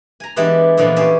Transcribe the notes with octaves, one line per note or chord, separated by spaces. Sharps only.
G#5 A#5
E3 G#3 B3 D4 E4 G4
A#2 D3 E3 F3 G#3 B3
G#3 C#4 G4 C5